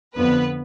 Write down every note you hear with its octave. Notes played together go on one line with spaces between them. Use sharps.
F2 D3 F3 B3 B4